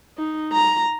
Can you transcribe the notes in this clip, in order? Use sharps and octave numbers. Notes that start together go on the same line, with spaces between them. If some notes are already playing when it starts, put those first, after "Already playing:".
D#4
A#5